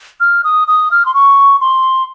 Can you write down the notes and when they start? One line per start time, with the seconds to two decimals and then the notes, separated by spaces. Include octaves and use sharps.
0.20 F6
0.44 D#6
0.68 D#6
0.91 F6
1.06 C6
1.14 C#6
1.61 C6